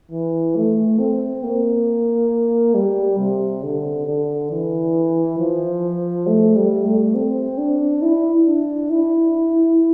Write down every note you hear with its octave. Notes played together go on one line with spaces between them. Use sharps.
E3
A3
C4
A#3
G3
C3
D3
D3
E3
F3
A3
G3
A3
C4
D4
E4
D4
E4